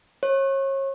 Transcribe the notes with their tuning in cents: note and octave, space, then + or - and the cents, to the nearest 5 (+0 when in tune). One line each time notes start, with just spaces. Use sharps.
C#5 -35